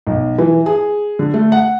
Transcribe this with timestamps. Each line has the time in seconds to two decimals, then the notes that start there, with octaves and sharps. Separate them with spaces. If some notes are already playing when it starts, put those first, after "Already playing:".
0.07 B1
0.38 E3
0.66 G#4
1.19 D3
1.34 A3
1.52 F#5